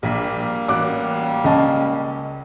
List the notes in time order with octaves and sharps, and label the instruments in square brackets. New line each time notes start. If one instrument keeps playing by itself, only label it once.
[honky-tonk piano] A#1 B6 [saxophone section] G3 A#3
[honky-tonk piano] A1 F#4 F#6 [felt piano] D6
[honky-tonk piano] C#2 [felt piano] C#4 D#5 A5